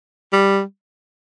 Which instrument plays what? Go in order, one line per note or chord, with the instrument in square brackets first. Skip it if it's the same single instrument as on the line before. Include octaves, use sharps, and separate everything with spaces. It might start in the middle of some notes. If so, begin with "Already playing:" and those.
[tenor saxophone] G3